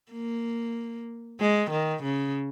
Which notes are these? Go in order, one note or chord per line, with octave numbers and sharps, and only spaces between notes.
A#3
G#3
D#3
C#3